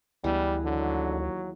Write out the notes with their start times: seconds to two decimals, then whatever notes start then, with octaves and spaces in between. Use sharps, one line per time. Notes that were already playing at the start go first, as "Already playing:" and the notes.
0.24 D2 E3 G3 G#3 B3 D4
0.64 D#2 D3 F#3